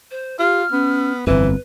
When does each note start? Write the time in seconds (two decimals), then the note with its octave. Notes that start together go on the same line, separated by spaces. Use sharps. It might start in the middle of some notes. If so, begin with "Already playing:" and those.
0.11 C5
0.39 F4 G4 F6
0.72 B3 C#4
1.27 G1 F2 E3 C4 B4